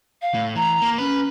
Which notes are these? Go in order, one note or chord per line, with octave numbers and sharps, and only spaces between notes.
F5
A2
E3 A#5
A#3
C#4 B4